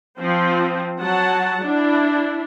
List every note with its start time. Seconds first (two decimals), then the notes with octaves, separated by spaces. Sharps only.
0.19 F3 C4
1.00 F#3 F#5 A5
1.63 D4 E4